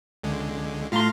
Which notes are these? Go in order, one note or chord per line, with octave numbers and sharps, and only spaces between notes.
C#2 D3 G#3
A2 A3 F4 F5 A#5 C6